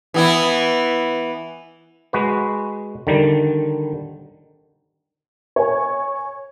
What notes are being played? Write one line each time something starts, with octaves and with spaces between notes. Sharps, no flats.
E3 B3 E4
G#3 F#4 B4
D3 D#3 G3
C#5 G#5